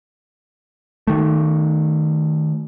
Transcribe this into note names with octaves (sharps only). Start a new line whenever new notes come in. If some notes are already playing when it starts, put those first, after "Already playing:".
D#3 A3